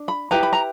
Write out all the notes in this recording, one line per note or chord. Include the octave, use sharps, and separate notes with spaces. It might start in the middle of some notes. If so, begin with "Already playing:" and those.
Already playing: D4
B5
E4 G4 B4 A#5
B5
A#5